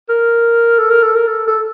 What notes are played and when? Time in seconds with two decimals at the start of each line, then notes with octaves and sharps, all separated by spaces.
0.09 A#4
0.78 A4
0.90 A#4
1.03 A4
1.15 A#4
1.27 A4
1.47 A4